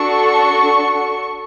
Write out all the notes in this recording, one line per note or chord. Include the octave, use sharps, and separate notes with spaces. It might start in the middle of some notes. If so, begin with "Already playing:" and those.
Already playing: D4 F#4 A4 C#6